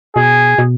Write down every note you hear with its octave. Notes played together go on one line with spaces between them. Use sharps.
B2 G#4
B2